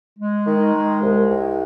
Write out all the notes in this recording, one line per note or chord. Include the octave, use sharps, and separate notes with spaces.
G#3
D#3
G#3
C2
C2